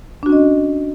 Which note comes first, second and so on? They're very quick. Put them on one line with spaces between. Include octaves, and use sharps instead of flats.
D4 F#4 C#4 D#5